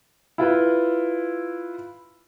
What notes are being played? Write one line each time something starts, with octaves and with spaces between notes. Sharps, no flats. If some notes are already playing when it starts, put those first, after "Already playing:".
E4 F4 B4